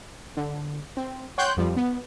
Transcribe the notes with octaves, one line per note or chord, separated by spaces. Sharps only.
D3
C4
C#5 F#5 G5 C6 F#6 G6
F2 F3 G3
B3